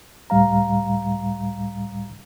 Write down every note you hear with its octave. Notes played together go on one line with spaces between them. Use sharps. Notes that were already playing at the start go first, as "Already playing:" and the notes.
C#2 A2 G3 F5 A#5